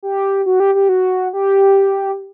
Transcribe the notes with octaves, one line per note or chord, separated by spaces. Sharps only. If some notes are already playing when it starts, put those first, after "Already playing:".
G4
F#4
G4
G4
F#4
G4